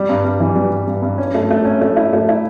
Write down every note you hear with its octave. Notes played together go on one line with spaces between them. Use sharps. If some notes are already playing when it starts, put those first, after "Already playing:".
Already playing: G3
G2
G2
E3
G3
G2
G2
G2
C#4
A3
A3
C#4
A3
E4
A3
E4